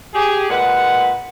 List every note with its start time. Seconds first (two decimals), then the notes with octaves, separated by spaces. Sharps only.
0.14 G4 G#4
0.50 A#2 G#3 B4 F#5